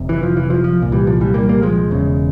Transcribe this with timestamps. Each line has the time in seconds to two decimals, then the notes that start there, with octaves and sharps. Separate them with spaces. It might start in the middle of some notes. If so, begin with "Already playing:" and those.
Already playing: F1 C3
0.09 E3
0.23 F3
0.37 E3
0.50 F3
0.64 F3
0.79 C2 A#2
0.92 E3 G3
1.07 F3
1.21 E3 G3
1.34 G3 A#3
1.49 G3 A#3
1.62 F3 G#3
1.91 E1 E2 C#3